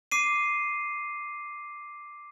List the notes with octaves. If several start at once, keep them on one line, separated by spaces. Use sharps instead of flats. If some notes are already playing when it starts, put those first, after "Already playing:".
D6 C7 D#7